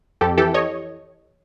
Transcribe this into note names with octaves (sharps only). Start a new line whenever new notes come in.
F2 G4 A4
E3 G4 A4
C#5 D#5